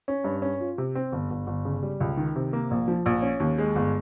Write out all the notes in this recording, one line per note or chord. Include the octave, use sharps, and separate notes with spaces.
C#4
G2
C#4
F4
C3
C4
G1
G1
G1
C#3
G3
C#2
D#3
C3
A#3
A#1
F3
A#1
C#4
D#2
G#3
G1